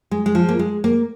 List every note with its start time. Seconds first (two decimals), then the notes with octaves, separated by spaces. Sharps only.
0.11 G#3
0.26 G#3
0.35 F3
0.49 A#3
0.59 G#3
0.84 A#3